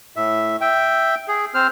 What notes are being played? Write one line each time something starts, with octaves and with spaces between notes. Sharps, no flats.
A2 E5
E5 G5
G#4
C4 C5 F6